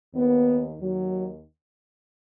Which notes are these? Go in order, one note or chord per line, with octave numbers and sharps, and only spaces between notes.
D#2 D#3 B3
D#2 D#3 F#3